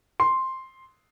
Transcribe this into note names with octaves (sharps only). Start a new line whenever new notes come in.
C6